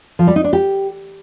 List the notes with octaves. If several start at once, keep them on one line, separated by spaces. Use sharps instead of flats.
F3
G3
D#4
D4
G4